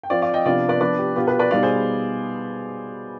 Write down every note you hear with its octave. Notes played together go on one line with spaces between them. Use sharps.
G5
F3 C4 F4 D5 F5
D5 F5
D#5 G5
C3 F3 B3 D4 F4 D5 F5
B4 D5
F3 B3 D4 B4 D5
G4
B2 B3 F4 G4
G4 B4
B4 D5
B2 G3 B3 D#4 D5 F5
G#4 C5